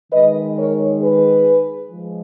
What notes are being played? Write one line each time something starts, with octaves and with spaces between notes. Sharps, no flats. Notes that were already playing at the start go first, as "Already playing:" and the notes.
D#3 G#3 D#4 B4 D#5
A#4 C#5
G#4 B4
F3 G#3